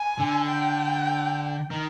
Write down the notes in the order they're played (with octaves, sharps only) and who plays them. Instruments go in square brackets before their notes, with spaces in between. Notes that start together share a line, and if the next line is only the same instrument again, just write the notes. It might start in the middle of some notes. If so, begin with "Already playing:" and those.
Already playing: [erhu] G#5
[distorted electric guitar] D3
[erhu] G5
[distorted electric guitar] D#3